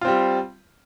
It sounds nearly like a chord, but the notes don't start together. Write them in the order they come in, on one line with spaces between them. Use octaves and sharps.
F4 C4 G3